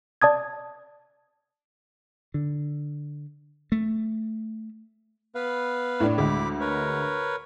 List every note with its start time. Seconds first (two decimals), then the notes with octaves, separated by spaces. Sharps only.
0.22 D5 A5 D#6 G#6
2.34 D3
3.72 A3
5.35 B3 B4 F5
6.00 A2 D4
6.18 D2 G#3 B5 D6
6.61 A#4 B4 C#5